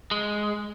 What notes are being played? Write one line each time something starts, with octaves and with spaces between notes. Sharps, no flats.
G#3